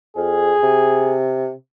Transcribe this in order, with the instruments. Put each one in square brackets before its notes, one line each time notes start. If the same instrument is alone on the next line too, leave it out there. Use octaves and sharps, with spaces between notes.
[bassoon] F2 [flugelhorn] G#4
[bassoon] C3